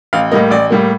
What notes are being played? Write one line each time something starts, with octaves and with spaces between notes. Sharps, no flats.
A1 F5
A2 G3 A#3 D#5
A1 D5
A2 G3 A#3